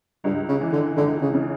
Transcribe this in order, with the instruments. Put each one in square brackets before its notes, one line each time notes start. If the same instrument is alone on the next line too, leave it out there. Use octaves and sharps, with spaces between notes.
[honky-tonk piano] C#2 [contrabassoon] G2
[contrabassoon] C#3
[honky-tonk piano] E3
[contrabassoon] D3
[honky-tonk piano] C#2 [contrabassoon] D3
[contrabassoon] C#3
[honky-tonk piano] C#3